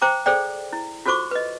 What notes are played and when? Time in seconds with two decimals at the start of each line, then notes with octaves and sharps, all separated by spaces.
0.02 C5 G5 A#5 D6
0.26 G#4 A4 C5 D5 G5
0.73 E4
1.06 F4 F#4 A4 C5 C#6 D6
1.31 B4 D#5